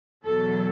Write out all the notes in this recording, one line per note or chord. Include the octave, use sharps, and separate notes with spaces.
E2 B2 F#3 A4